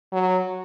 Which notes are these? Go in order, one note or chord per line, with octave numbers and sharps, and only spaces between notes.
F#3